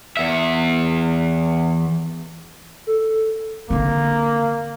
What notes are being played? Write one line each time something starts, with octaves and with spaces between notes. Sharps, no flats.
E2 E5
A4
D3 A#3 C4